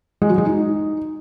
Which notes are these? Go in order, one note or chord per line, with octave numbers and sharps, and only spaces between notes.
G#3
F#3
G#3
D#4